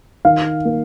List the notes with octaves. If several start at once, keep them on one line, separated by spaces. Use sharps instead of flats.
D#3 F5
A#3